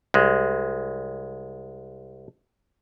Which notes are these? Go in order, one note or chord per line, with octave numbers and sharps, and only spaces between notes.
C2 G#3